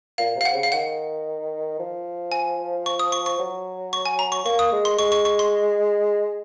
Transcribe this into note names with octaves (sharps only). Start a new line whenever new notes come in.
A#2 F5
C3 F5
F#5
C#3
F5
D#3 F#5
F3
G#5
C#6
D#6
C#6
C#6
F#3
C#6
G#5
A#5
C#6
A#3 C#6
D#6
G#3
C6
G#3 C#6
C#6
C#6
C6